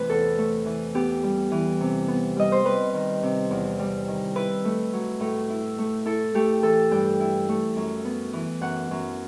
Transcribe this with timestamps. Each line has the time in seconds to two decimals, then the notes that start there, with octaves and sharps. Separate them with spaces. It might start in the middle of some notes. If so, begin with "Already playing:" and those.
Already playing: C3 E3 A3 B4
0.09 E2 A4
0.38 A3
0.66 E3
0.95 B3 G4
1.23 G3
1.52 E3
1.81 C3
2.08 B3
2.36 G3 D#5
2.52 C5
2.65 G3 B4
2.94 D#3
3.23 C3
3.51 E2
3.79 G3
4.08 D#3
4.36 E4 B4
4.65 A3
4.93 F#3
5.20 A2
5.50 E4
5.79 A3
6.05 E4 A4
6.35 A3 G4
6.63 E3 A4
6.91 G2 G5
7.21 E4
7.49 A3
7.77 F#2
8.05 B3
8.33 E3
8.61 F#2 F#5
8.91 F#2